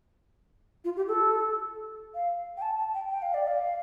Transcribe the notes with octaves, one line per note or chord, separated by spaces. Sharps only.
F4
G4
A4
F5
G5
A5
A5
G5
G5
F5
D5
F5